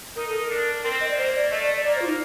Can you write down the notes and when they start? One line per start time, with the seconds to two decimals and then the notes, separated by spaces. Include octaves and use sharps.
0.16 D#4 A#4
0.28 A4
0.39 A#4
0.50 D4
0.84 C4 A#4
1.01 D#5
1.09 D5
1.17 A#3 C5
1.35 D5
1.51 A3 D#5
1.62 D5
1.73 D5
1.84 A#3 D5
1.96 C5
2.02 F4
2.07 D#4